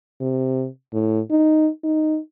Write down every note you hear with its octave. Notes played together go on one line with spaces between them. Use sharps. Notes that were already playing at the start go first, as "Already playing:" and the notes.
C3
A2
D#4
D#4